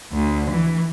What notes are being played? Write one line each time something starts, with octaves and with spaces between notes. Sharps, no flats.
D2
E3